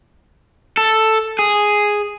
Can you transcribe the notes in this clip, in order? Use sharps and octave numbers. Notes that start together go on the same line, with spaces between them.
A4
G#4